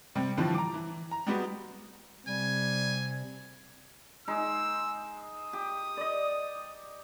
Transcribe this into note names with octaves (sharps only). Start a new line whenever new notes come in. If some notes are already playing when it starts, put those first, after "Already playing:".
C3 G3
A2 D3 E3 F3 G3
A#5 D6
E3
A#5
G3 G#3 B3 F#4 G4
C3 G3 G#5
G#3 D#4 E6
D#6
G4
D5 D#5